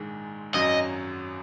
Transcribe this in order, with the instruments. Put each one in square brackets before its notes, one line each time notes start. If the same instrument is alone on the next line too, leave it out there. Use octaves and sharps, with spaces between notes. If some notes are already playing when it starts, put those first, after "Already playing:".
Already playing: [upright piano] A#1 G#2 D#3 G#3
[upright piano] G#1 F#2 F#3 [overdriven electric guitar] D#5